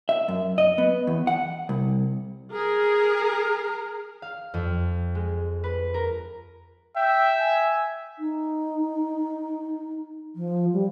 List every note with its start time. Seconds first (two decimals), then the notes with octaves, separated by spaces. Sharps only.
0.09 E5
0.28 F#2
0.58 D#5
0.78 B3
1.07 E2
1.27 F#5
1.69 C2
2.52 G#4 A#4
4.22 F5
4.54 F2
5.15 G#3
5.64 B4
5.94 A#4
6.96 E5 G5
7.41 G#5
8.19 D#4
10.35 F3
10.73 G3